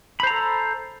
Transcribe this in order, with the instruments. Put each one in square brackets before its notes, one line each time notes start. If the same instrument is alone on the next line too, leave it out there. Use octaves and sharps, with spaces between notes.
[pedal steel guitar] B5
C5
A#5
A4